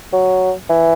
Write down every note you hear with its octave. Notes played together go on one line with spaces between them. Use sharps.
F#3
E3